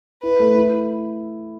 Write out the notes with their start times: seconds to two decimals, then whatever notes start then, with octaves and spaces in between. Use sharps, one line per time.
0.23 E4 B4
0.39 A3
0.55 E4